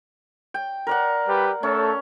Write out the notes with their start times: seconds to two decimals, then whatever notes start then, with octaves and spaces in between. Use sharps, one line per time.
0.54 G5
0.87 A#4 D5 F#5
1.28 G3 G4 B4
1.63 A3 C#4 A4